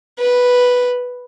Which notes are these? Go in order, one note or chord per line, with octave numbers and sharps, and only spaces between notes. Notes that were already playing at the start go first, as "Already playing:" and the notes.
B4